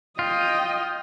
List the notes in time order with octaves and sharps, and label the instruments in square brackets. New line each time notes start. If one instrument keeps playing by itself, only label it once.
[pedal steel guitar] F4 [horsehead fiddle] D#5 G5